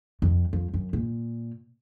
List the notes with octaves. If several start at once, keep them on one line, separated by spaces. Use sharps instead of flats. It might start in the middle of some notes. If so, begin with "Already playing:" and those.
F2
F2
F#2
A#2